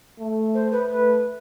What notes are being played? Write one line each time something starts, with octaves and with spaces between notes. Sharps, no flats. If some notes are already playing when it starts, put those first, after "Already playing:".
A3
C5
B4
A3 B4